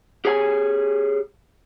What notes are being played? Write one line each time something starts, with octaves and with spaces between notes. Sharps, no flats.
G4 G#4 C#5 E5 G#5